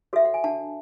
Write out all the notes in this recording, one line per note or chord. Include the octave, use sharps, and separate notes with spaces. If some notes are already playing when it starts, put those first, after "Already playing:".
F#4 A4 C#5 E5
F#5
G#5
D4 F#5 A5